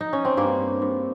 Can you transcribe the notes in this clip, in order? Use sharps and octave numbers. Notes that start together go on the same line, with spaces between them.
D#4
C#4
C4
G2 A#3
G2